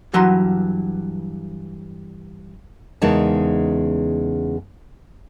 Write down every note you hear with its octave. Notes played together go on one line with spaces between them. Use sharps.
G2 E3 F#3 F#5 A#5 C6
E2 C#3 G#3 D#4 A#4 A5